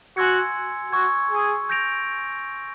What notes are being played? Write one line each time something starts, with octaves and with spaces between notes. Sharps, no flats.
F#4 G#5 C6 E6 G#6 C#7
F#4 C#6 E6 G#6
G#4
G6 A#6 D7 F7